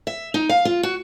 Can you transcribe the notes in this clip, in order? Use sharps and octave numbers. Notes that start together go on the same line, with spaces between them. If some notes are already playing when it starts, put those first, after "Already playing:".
E5
D#4
F5
F4
F#4